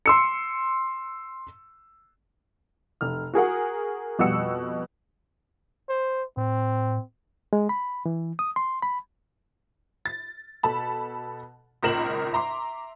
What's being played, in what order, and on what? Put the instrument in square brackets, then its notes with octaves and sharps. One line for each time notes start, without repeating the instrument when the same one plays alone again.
[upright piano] C6 E6 C#7
[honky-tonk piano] F1 F6
F#4 G#4 A#4 F#5
F2 B2 G3 F#5 E6 C#7
[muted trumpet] C5
[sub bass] A2 [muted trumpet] C4
[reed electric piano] G#3
B5
E3
D#6
C6
B5
[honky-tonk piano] A6
B2 A4 A5 B5
G#1 C#2 A#2 A#4 E7 F#7
E5 A#5 C6 D6